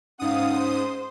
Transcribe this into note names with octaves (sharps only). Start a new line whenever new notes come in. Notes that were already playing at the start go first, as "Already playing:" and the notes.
G#2 C#4 F5 F#5 D#6
C5